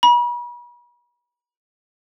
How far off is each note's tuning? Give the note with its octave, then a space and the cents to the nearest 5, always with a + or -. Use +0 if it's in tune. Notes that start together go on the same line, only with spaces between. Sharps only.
B5 -40